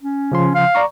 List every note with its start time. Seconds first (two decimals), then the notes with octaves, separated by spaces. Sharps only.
0.02 C#4
0.32 C#3 F3 C6
0.55 F5
0.75 D5 A#5 C#6